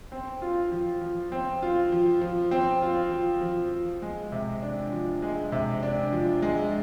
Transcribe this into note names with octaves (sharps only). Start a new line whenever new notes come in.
C4
F4
F3
F3
C4
F4
F3
F3
C4
F4
F3
F3
F3
G#3
C3
D4
F3
G#3
C3
D4
F3
G#3